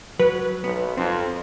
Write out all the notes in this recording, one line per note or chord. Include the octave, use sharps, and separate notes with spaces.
F#3 B4
B1 B3
F2 C4